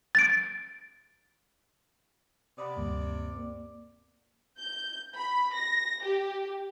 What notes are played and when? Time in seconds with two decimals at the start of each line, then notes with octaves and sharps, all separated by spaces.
0.15 A6 D7
2.58 C3 D5 F#5 B5 D#6
2.76 D2 G2 A#3
3.36 A#3
4.59 G6
5.16 B5
5.54 A#6
6.03 G4